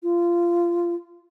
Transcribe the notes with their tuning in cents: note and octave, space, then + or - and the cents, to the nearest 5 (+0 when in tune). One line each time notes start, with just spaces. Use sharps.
F4 -20